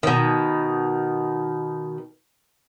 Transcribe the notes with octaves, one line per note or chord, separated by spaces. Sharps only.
B2 D#3